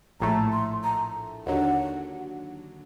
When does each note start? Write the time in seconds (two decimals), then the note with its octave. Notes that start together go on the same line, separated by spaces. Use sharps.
0.20 A#1 A2 A3 A#5
0.52 C6
0.84 A#5
1.47 D#2 D3 F#3 F#5